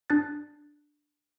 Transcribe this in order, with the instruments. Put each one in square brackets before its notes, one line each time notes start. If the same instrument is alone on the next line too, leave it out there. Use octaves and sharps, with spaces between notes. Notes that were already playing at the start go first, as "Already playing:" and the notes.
[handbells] D4 F#6 A6